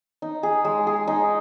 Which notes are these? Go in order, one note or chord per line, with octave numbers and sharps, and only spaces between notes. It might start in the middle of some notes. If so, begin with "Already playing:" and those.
D#4
G#4
G#3
G#4
D#4